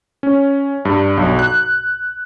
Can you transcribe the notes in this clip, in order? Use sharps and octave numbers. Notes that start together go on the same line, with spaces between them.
C#4
G2
B1
F#6